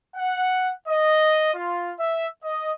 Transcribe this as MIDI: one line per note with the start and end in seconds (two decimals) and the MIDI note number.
0.16 0.72 78
0.88 1.53 75
1.55 1.93 65
1.99 2.27 76
2.44 2.73 75